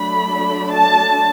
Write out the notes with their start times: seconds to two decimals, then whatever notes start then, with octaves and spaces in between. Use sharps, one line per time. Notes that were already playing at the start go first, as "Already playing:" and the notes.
Already playing: F#3 A3 D4 B5
0.72 A5